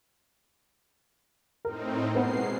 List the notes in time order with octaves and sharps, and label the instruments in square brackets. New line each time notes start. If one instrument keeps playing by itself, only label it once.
[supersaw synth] A2 C4 D#4 [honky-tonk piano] A#4
[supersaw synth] B2 G#3 C7 [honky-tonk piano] B3 C4 A#4